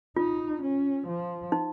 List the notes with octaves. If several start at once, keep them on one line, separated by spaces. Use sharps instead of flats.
D#4 F4
C#4
F3
D#4